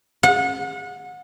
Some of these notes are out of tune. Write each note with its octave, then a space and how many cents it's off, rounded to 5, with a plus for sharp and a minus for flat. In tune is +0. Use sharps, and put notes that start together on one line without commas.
F#5 -30